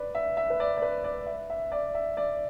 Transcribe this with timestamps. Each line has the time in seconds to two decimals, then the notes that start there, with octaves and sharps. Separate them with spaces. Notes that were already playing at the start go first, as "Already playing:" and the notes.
Already playing: B4 D5
0.15 E5
0.37 E5
0.50 B4
0.60 D5
0.77 D5
0.82 B4
1.04 D5
1.26 E5
1.50 E5
1.72 D5
1.95 E5
2.17 D5